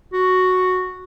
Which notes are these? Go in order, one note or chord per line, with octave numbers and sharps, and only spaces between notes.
F#4